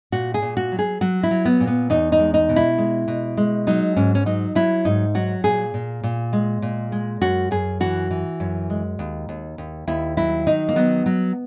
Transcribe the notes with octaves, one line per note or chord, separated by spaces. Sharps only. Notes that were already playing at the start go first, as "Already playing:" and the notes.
A#2 F#4
G#4
A#2
F#4
F#3
G#4
F#3 F#4
E4
F#3
B3
A#2
B3
E2 D#4
D#4
G#3
D#4
B2
E4
G#3
B2
G#3
F#3 D#4
G#2 C#4
C#4
F#3 D#4
F#3 E4
G#2 D#4
F#3 F#4
A#2 G#4
A#2
A#2
G#3
A#2
G#3
F#2 F#4
F#2 G#4
E3 F#4
E3
F#2
G#3
D#2
D#2
D#2
D#2 E4
F#3 E4
D#3 D#4
A#3
F#3 B3
F#3